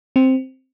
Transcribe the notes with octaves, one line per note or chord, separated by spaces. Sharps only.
C4